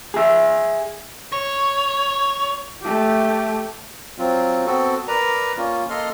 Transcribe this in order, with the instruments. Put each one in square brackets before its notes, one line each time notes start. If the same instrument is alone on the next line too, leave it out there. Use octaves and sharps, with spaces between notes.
[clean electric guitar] G#4 E5
[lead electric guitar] C#5
[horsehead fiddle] A3 G4
[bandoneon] F#3 C4 F4
B3 C4 F#4 A4
A#4 B4 D5 A#5
A#3 C#4 F4
A#3 A4 D#5 C6 F6